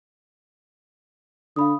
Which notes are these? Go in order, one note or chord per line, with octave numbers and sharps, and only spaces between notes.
D3 F5 B5 D#6